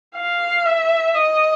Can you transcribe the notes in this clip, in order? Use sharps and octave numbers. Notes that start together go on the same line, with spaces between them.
F5
E5
D#5